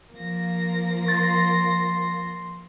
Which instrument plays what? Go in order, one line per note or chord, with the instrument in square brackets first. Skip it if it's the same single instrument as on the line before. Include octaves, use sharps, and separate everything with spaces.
[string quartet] F3 A#3 A#6
[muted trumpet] C6 [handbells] A6